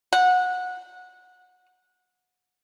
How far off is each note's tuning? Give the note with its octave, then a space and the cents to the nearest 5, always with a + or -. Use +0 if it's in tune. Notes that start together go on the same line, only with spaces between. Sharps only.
F#5 -20